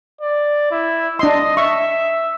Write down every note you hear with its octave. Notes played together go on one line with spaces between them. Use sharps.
D5
E4
D4 D#5 C6
E5 C#6